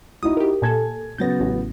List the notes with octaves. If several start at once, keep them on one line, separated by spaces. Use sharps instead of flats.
D#4 E4 F#4 D#6
G4 A#4
A#2 A4 G#5 A5 G#6
C#3 F#3 B3 G6 A6 A#6
A1